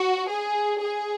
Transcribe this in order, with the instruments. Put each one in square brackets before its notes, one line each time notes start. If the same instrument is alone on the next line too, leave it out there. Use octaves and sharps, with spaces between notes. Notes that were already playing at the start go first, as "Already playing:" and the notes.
Already playing: [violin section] F#4
G#4
G#4